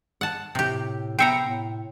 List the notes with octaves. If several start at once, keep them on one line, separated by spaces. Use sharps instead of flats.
F#5 A5
A2 C3 G4
B3 C5 E5 G5 A#5 C#7
A2